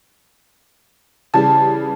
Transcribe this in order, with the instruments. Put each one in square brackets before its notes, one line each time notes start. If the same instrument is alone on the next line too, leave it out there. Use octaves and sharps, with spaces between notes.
[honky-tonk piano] C#3 E3 G3 [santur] A5